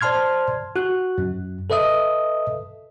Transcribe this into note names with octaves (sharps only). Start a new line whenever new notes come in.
C5 D5 A5 C6 F6 G#6
F#4 F#6
F#2
A4 B4 D#5 E5 D#6